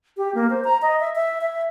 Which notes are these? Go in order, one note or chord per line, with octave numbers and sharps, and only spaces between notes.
G4
A#3
C5
A#5
D#5
E5
E5
E5